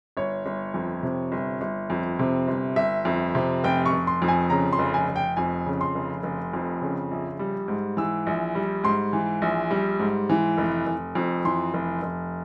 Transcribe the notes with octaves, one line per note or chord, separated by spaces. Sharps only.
G1 C#5
G1
F2
C3
G1
G1
F2
C3
G1
G1 E5
F2
C3
F1 G5
C#6
F1
C6
F2
G#5
C#3 A#5
C6
F1
G#5
F1
G5
F2 G#5
C#3
C6
F1
F1
F2
C#3
A#1
G3
G#2
E3 E6
A#1
G3
G#2 C6
E3
A#1
G3
G#2
E3
F1
F1
F2
E3 C6
F1
F1